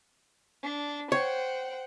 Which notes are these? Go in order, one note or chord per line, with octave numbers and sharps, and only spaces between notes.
D4
C5 C#5 F#5 G5